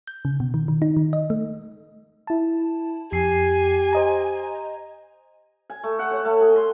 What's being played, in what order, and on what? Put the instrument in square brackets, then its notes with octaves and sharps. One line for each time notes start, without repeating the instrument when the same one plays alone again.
[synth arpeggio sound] G6
C#3
B2
D#3
D#3
D#4
D#3
D#5
A3
[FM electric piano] E4 A5
[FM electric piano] F2 C7 [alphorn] G4 [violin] G#5
[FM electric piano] C5 D#5 A#5
[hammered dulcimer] G#5
A3
F#5
C#5
A3
G#4
C6